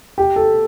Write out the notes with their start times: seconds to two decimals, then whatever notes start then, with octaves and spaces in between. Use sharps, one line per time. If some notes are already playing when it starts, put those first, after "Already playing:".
0.18 G4
0.36 A4